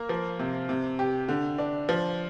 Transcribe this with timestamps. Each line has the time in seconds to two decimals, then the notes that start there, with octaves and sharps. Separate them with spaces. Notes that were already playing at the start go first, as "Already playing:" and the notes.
Already playing: A#3 A#4
0.09 F3
0.40 C3
0.69 C3
0.99 G4
1.29 D3
1.58 D4
1.89 F3